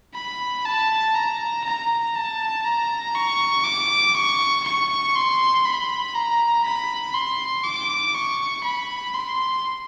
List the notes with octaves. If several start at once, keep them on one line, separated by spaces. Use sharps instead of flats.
B5
A5
A#5
A#5
A5
A#5
C#6
D6
C#6
C#6
C6
B5
A#5
B5
C6
D6
C#6
B5
C6